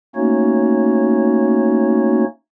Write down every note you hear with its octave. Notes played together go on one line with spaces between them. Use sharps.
A3 A#3 C#4 D#4 F#4 C#5